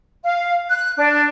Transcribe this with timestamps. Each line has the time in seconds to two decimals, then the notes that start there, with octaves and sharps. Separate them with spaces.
0.24 F5
0.69 F#6
0.98 D4